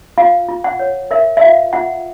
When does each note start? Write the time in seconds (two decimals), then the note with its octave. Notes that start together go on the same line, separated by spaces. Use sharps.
0.18 F4 F5
0.48 F4
0.64 F#5
0.79 C#5
1.11 A#4 E5
1.37 E5
1.41 F4 F5
1.73 F4 F#5